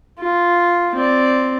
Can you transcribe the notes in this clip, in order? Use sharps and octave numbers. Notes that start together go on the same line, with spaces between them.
F4
C4 D5